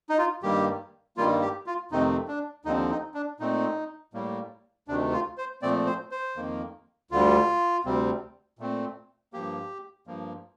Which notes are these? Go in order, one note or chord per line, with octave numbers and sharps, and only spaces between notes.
D#4
F4
G2 D#3 G3 A#3 G4
G2 D#3 G3 A#3 F4
G4
F4
F2 C3 D#3 A3 C4 D#4
D4
D#2 D3 F3 C4 D#4
D#4
D4
A#2 A3 C4 D#4
A2 G3 A#3
D2 C3 D#3 A3 D4
F4
C5
A#2 F3 A3 C4 D5
C5
C5
F2 D#3 A#3
D2 D3 G3 F4
D2 C3 G3 C4
A#2 A3 C4
G2 F3 A#3 G4
G2 F3 A#3